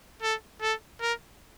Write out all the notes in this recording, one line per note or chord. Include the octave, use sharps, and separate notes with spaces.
A4
A4
A#4